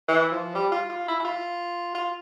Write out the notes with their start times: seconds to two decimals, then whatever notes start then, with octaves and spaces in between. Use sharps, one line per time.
0.08 E3
0.31 F3
0.55 G3
0.72 F4
0.89 F4
1.08 E4
1.20 E4
1.24 F4
1.95 F4